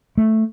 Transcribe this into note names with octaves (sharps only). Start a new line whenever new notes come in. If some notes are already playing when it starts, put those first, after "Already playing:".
A3